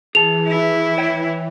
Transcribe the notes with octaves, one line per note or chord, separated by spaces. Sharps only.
E3 G#4 A5 F7
E4
C#5 G5